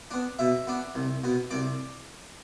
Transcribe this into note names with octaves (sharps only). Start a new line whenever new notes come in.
B3 D4
B2 E5
B3 D4
C2
B2 B3
C2 D5